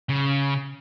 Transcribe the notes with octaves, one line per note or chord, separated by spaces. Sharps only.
C#3